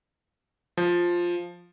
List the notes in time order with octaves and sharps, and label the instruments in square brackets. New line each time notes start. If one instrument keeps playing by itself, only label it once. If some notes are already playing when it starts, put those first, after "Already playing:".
[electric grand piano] F3